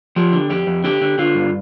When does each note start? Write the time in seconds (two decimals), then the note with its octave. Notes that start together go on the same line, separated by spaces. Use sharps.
0.16 F3 G4
0.33 D3
0.49 F2 G4
0.67 F2
0.84 D3 G4
1.02 D3
1.18 D3 F4
1.35 G2